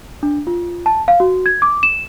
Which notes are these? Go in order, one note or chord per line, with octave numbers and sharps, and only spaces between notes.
D4
F4
A5
F5
F#4
G#6
D6
E7